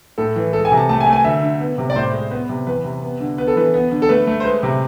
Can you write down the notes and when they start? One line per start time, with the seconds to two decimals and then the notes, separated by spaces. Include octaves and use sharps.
0.18 A2 A4
0.36 E3
0.53 G#3 A4
0.65 G#5
0.72 C3
0.77 A5
0.89 A3 A5
1.00 G#5
1.06 A3
1.13 G#5
1.24 D2 E5
1.42 D3
1.60 B3
1.78 C3
1.90 D5
1.96 A2 C5
2.13 G#3
2.31 B3 B4
2.49 C3
2.67 E2 B4
2.84 C3
3.03 B3
3.20 D3
3.38 B3 B4
3.47 A4
3.56 E3 B4
3.74 B3
3.92 D3
4.02 A4
4.09 A3 B4
4.27 A3
4.40 C5
4.45 G#3 B4
4.63 C3